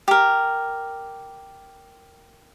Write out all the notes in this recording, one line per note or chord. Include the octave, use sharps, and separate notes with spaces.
G4 A#4